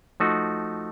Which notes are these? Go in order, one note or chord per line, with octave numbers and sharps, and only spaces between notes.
F3 A3 D#4 F#4